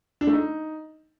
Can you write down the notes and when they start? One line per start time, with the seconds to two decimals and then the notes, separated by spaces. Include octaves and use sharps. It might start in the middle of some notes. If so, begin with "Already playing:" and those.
0.21 D4
0.27 A3
0.33 D#4